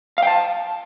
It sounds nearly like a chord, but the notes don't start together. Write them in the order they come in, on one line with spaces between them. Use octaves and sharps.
F5 G5 A5